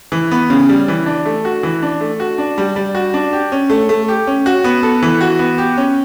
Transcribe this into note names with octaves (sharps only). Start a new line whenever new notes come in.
E3
B3
C#3
G3
E3
D4
A3
F#4
E3
D4
A3
F#4
D4
G3
G3
F#4
D4
G4
C#4
A3
A3
G4
C#4
F#4
B3
A4
E3
F#4
B3
G4
C#4